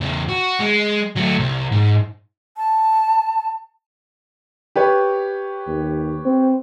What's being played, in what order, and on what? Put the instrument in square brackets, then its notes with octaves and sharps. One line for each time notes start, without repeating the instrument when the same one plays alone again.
[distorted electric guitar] E2 C#3
F#4
G#3
F#3 A3
C2
G#2
[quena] A5
[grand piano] G4 B4 C#5
[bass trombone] D#2
C4